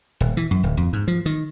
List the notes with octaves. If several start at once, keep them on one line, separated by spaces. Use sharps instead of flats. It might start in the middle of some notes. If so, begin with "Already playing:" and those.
D#1
E3
F#2
D1
F2
G#2
F3
D#3